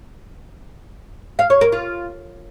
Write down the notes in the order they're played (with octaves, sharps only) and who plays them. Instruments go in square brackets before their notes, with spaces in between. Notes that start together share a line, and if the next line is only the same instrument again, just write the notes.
[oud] F5
C#5
A#4
F4